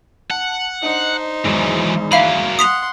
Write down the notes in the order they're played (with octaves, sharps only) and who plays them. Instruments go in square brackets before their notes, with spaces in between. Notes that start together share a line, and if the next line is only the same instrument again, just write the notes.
[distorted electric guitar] F#5 [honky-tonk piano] A5
[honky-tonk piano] D4 D#5 [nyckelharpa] D#4 C5
[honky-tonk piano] G#1 E2 G#2 [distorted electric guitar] E3 F#3
[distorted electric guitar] F#3 A#3 [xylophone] E5 F5 B5
[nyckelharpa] F#5 C6 [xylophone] D#6 B6 F7